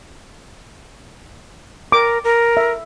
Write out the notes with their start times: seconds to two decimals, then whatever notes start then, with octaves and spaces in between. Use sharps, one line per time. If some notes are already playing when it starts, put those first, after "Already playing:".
1.92 A#4 D6
2.24 A#4
2.57 E5